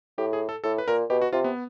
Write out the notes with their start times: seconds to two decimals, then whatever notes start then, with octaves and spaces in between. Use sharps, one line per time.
0.18 A2 G4
0.33 G#4
0.49 A4
0.64 A2 A4
0.78 B4
0.88 A#2 A#4
1.10 B2 G4
1.22 F#4
1.33 C3 F4
1.44 B3